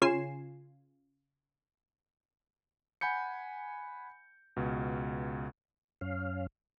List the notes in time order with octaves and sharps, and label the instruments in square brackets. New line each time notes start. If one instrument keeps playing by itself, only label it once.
[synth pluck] C#3 C#4 F4 G#5 C7 E7
[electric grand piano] F#5 G#5 B5 G6 C#7
C#2 B2
[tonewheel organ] F#2 C#4 F5